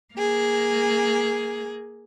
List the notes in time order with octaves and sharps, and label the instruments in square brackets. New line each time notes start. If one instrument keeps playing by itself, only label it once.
[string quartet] A#3 G#4